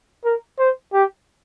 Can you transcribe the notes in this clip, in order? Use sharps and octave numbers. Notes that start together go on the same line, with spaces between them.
A#4
C5
G4